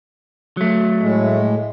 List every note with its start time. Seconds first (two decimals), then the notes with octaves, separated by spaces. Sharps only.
0.57 F#3 A3
1.01 A2 G#3